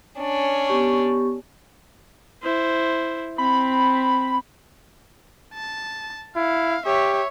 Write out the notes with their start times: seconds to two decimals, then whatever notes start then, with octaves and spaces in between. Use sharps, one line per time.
0.19 C#4 D4
0.67 B3 G4 C#6
2.42 E4 C5
3.38 C4 B5
5.54 A5
6.36 E4 F5
6.86 G4 C#5 E5